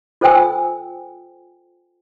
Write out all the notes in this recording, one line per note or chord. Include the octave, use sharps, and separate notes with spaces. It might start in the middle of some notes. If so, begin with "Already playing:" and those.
F4 A4 C5 G5 G#5 E6